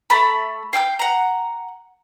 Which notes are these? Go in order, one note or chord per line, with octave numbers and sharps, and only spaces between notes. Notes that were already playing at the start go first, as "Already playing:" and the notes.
A3 B5
F5 G5 E6 G6
F#5 A#5